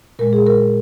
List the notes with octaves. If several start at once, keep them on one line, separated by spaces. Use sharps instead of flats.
A#2 G#3 A#4
G#4
A#4